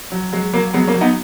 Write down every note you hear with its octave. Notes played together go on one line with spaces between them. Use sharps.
F#3
F#3 G#3
F#3 A#3
F#3 G#3 B3
A#3 C#4
F#3
B3 D#4